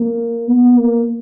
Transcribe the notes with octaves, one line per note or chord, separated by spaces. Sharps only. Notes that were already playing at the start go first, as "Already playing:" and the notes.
Already playing: A#3
B3
A#3